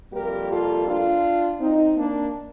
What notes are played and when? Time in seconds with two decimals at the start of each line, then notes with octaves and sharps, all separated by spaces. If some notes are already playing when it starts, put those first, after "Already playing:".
0.13 F2 C3 G3 A#3 G4 A#4
0.50 F4 A4
0.87 D4 F4
1.60 C4 D#4
1.97 A#3 D4